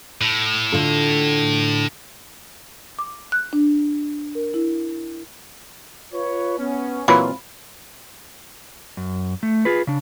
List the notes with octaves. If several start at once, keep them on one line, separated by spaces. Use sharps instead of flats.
A2
D3 F4 A4
D6
F#6
D4
A#4
E4
F4 B4 C#5
B3 C#4
A#2 E3 F#3 C4 F4 B5
F#2
A3
F4 G#4 B4
C#3 D4